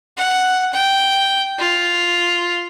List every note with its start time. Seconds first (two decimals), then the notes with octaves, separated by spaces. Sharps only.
0.17 F#5
0.73 G5
1.59 F4